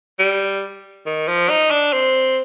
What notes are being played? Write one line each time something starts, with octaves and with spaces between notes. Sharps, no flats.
G3
D#3
F3
D#4
D4
C4